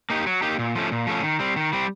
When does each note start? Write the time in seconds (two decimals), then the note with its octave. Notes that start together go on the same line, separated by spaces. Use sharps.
0.10 A#3 D#4 G4
0.27 F#3
0.42 A#3 D#4 G4
0.59 A#2
0.75 F3 A3 C#4
0.92 A#2
1.07 F3 A3 C#4
1.23 D#3
1.40 G3 C4
1.56 D#3
1.73 G3 C4